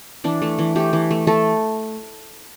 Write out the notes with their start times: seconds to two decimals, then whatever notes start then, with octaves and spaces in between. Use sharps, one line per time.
0.24 E3 D4
0.42 A3
0.59 E3
0.76 A3 G4
0.93 E3
1.11 A3
1.27 A3 A4